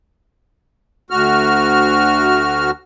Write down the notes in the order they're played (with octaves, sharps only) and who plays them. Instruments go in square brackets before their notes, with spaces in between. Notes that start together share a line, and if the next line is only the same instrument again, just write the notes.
[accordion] D2 F#4 F6